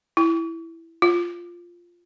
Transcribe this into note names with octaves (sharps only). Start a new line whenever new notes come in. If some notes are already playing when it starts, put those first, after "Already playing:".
E4
F4